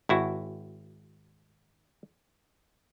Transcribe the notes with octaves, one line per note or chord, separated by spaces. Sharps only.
G#1 E4 F#4